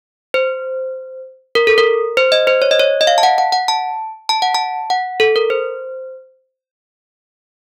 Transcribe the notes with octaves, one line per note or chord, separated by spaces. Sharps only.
C5
A#4
A4
A#4
C5
D#5
C5
C#5
D#5
C#5
D#5
F5
A5
F#5
F#5
F#5
A5
A5
F#5
A5
F#5
A4
A#4
C5